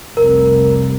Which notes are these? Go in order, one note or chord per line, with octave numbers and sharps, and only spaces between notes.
F1 C2 A#4